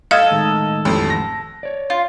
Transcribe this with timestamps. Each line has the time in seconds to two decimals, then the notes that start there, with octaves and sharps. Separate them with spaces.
0.11 A4 D#5 F5 E6 F6 G#6
0.31 A2 D#3 G#3
0.85 A1 F2
1.10 A#6
1.63 C#5 D5
1.90 F4